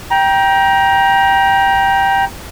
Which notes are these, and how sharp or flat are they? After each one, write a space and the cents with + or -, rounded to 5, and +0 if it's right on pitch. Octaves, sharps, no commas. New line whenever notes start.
G5 +0 A#5 +25